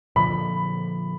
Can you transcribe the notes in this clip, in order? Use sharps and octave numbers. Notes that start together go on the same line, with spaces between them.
A#2 D3 F3 B5